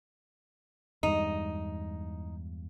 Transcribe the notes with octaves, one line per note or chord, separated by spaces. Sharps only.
E2 G2 G#3 D#4